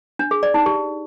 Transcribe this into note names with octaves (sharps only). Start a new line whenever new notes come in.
D4
G#4
D5
D#4
G4